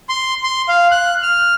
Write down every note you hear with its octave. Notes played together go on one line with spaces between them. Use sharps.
C6
C6
F5
F#6
F6